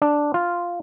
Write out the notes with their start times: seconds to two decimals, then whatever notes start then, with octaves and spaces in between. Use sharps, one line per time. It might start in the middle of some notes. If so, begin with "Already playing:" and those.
0.02 D4
0.34 F4